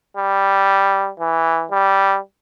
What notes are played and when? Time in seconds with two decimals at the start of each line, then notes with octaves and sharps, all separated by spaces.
0.17 G3
1.20 E3
1.71 G3